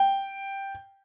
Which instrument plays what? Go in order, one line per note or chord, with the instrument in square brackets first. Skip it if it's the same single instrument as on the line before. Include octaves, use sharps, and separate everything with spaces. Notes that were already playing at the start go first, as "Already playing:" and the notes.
Already playing: [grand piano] G5